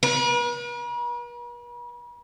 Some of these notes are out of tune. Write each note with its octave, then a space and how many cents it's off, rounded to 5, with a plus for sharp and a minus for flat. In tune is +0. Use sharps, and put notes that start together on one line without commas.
B4 -45